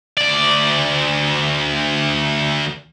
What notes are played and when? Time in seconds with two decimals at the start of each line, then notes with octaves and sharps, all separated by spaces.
0.17 D2 D5